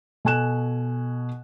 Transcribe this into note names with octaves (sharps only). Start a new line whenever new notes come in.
B2 A4 G#5 F#6 E7